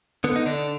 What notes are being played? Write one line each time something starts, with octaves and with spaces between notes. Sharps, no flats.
D3 B3
D#4
D3 D4